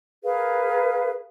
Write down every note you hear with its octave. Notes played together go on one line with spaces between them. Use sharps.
G#4 A#4 B4 F5